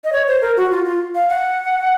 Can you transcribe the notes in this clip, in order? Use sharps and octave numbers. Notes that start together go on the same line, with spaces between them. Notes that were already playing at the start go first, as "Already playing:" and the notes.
D#5
C#5
C5
A#4
F#4
F4
F4
F5
F#5